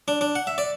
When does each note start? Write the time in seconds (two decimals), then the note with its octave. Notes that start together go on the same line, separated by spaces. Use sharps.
0.08 D4
0.21 D4
0.35 F#5
0.47 E5
0.58 D5